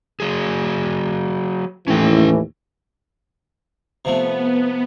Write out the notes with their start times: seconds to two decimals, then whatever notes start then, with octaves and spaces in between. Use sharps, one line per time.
0.20 F#3 G#4
1.88 D#2 A2 E3 C#4 G5
4.05 C3 F3 A3 B3